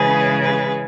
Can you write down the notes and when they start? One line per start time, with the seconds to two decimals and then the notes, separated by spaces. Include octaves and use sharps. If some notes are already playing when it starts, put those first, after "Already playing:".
Already playing: C#3 E3 G#3 G#4 B4
0.40 G#4 B4